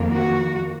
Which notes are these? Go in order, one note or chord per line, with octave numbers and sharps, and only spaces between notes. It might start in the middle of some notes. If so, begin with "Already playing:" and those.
Already playing: F2 D#3 A#3
F#4